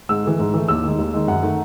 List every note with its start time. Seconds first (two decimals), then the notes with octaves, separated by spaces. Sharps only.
0.09 G#2 E6
0.24 E3 A3
0.39 G#2
0.54 E3 A3
0.68 D#2 E6
0.84 D#3 G#3
0.99 D#2
1.14 D#3 G#3
1.28 F#2 F#5
1.43 D#3 A3